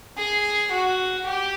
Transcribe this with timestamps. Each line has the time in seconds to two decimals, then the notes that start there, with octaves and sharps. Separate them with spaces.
0.17 G#4
0.72 F#4
1.26 G4